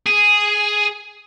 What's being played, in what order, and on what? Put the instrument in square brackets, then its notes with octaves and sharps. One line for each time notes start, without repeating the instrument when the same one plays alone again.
[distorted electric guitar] G#4